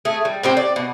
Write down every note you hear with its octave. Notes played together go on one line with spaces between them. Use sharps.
A3 G#4
G3
A2 C4 G4
D5
B2